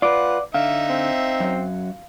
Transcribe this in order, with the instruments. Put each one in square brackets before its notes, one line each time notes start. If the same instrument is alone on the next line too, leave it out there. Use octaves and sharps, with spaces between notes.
[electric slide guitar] F4 B4 [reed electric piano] D5 D6 [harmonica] F#5
[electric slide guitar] D3 [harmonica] D#4 E5 [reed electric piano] F5
[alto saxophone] C4
[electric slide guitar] F#2 F#3